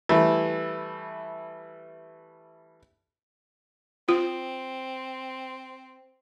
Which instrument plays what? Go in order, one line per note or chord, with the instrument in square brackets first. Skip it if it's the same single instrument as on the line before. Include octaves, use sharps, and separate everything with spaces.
[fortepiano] E3 G3 A3 E4
[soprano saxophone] C4 [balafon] F4